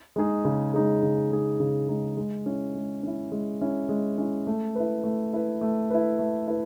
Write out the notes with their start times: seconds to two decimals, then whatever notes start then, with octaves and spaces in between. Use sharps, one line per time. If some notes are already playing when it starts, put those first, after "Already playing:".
0.16 G#3 D#4 G#4
0.45 C#3
0.74 G#3 D#4 G#4
1.03 C#3
1.31 G#3 D#4 G#4
1.60 C#3
1.89 G#3 D#4 G#4
2.17 G#3
2.46 C#4 E4
2.75 G#3
3.03 C#4 E4
3.32 G#3
3.61 C#4 E4
3.89 G#3
4.18 C#4 E4
4.47 A3
4.75 E4 B4
5.04 A3
5.33 E4 B4
5.61 A3
5.90 E4 B4
6.19 A3
6.47 E4 B4